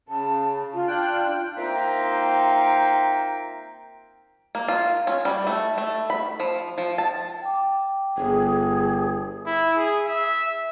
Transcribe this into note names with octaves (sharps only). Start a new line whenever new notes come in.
C#3 A5
F4
D4 G5 F#6
A#3 C4 D#4 F4 E5 G5
A#3
F4
C#4
G3
A3
A3
B5
F3
F3
A5
G5 D6
G1 G#4
E4
G#4
E5